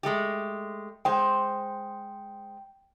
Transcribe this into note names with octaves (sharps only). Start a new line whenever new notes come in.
G#3 A3 G4
G#3 C5 G5